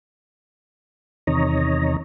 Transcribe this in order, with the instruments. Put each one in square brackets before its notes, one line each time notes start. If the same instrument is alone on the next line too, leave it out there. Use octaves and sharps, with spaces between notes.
[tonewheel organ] E2 C3 D#3 C#5 D#5 A#5